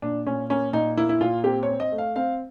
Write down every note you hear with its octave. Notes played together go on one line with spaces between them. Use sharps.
A#2 D4
A#2 C#4
A#3 C#4
A#2 D#4
A#3 E4
E4
A#2 F4
C4 G4
C#5
C4
D#5
A3
F5
C4 F5